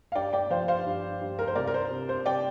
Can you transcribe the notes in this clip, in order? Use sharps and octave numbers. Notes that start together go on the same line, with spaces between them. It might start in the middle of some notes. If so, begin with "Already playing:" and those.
F5
G2 D5 G5
D5 G5
F3 C5 F5
C5 F5
G2
G2
A#4
C5
C2 A#4 D5
A#4
C5
C3
C5
C3 D5 G5